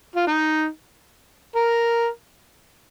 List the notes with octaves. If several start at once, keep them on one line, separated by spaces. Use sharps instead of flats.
F4
D#4
A#4